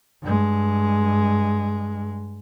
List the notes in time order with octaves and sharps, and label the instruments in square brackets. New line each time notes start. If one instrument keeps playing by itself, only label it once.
[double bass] G2 G#3